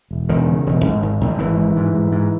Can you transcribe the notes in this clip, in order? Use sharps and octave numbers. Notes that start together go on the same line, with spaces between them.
E1
E1 D#3
C#3
E1
G#1
G#1
G#1
G#1 E3
G#2
G#2
G#2
G#2